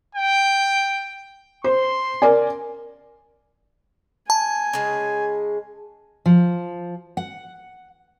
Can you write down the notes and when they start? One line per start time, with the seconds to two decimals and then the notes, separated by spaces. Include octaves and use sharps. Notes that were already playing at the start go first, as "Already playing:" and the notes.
0.15 G5
1.64 C5 C6
2.22 A#4 D5 G#5
4.30 G#5 A5
4.73 C#3 G#3
6.26 F3
7.17 F#5